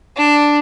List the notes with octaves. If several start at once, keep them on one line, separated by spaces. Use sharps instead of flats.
D4